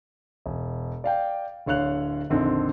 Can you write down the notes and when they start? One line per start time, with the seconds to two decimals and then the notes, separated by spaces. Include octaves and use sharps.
0.46 E1
1.04 D5 F5 G5
1.66 D1 D3 C#5 F5 F#6 F7
2.30 A#1 F2 D3 D#3 C4